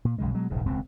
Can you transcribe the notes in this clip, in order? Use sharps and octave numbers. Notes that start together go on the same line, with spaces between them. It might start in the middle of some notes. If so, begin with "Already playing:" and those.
A#2
B1 F#2 C#3 G#3
B2 F#3 G#3
E1 A#1 G#2 C#3
D#1 C#2 B2 C4